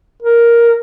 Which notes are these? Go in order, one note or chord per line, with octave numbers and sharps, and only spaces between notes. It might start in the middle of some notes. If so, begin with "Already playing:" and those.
A#4